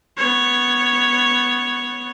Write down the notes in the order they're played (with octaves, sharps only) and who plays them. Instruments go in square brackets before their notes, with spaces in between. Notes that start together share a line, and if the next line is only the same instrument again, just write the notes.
[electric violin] B3 C#5